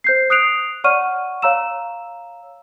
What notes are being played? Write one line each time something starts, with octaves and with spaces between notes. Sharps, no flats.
C5 G6 C7
D#6 F#6 C7 D7 F7
C#5 D5 F#5 C#6 F6 D#7
C#5 F5 A#5 E6 E7